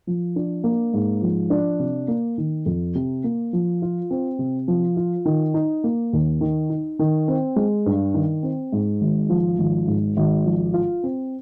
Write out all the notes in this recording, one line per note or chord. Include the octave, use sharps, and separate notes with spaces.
F3
D4
A#3
G#2
F3
D4
C3
A#3
D#3
F2
C3
A#3
F3
F4
C4
C3
F3
F4
D#3
D#4
A#3
D#2
D#3
D#4
D#3
C4
G#3
G2
D#3
C4
G#2
G#1
F3
G#1
G#2
G#1
F3
F4
C4